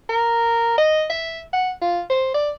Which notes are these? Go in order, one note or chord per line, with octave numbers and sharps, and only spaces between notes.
A#4
D#5
E5
F#5
F4
C5
D5